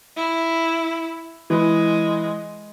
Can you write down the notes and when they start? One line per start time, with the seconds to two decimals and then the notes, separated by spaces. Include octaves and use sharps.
0.16 E4
1.50 E3 G#3